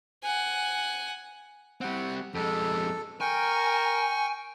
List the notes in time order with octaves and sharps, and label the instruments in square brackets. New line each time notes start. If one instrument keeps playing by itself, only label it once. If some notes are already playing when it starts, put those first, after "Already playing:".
[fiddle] F#5 G#5
[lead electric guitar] G3 C4 [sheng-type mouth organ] F#5
[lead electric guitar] F2 G#3 [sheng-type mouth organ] A4
[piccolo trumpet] A#4 [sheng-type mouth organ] G5 C#6 [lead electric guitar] G#5